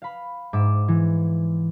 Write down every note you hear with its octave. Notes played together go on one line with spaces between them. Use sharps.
F5 B5
G#2 E5 D6
E3